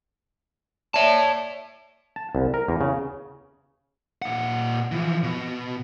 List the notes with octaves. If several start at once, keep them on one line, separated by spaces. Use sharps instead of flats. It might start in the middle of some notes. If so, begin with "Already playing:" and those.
C#5 D5 E5 G5 A5
A5
C2
A#4
E2
C#3
A#2 F#5
E3 F3
B2